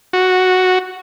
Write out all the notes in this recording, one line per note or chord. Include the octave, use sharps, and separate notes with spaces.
F#4